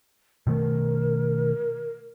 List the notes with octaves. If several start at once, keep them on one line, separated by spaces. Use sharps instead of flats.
B2 D#3 A3 A#4